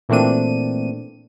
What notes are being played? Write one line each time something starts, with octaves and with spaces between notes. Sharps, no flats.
A#2 E3 A3 C4 D4 D#7